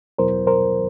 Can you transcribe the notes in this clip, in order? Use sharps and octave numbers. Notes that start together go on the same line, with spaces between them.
E2 B2 F#3 B3 E4 A#4 C5
A#4 C5